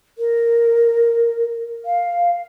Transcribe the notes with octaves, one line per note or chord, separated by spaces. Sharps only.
A#4
F5